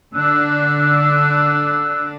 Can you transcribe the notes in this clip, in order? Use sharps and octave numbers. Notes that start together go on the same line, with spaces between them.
D3 D4 E6 F#6